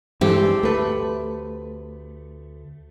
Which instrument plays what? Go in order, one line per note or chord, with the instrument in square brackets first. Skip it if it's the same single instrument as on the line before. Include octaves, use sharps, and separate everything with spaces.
[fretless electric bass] G2 E3 G#3 [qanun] C4 G4 A4
[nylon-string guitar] D2 B4 [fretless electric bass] A3